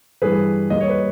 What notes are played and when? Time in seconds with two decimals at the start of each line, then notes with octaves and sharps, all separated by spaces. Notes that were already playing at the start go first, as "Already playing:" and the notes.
0.22 G2 E3 G3 G#4 B4
0.70 D#2 D#3 G3 D#5
0.80 C#5
0.89 B4